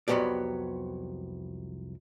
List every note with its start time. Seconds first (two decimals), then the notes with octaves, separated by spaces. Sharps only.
0.08 C2 F2 F#3 B3 G4 D5